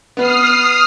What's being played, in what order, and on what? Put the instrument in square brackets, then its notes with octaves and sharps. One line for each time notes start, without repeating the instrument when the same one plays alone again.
[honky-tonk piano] B3 B4 [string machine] D#6 F6 C7